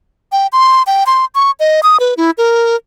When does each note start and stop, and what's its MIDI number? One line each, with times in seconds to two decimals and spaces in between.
0.32 0.47 79
0.53 0.83 84
0.87 1.04 79
1.06 1.25 84
1.35 1.51 85
1.60 1.80 75
1.83 1.98 87
2.00 2.14 71
2.17 2.31 64
2.38 2.76 70